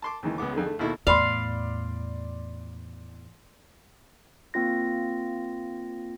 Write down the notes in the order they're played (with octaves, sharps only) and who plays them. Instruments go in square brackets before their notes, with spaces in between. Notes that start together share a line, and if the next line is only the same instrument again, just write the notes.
[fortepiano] A5 C6 D6
D#2 C#3 E3 G#3
C#2 C#3 B3 D6
F2 D3 D#3 G#4
D3 A3
D#2 B2 E4 A4
[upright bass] E2 A2 [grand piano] D5 B5 C6 [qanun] F5
[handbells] A#3 C4 F4 A#6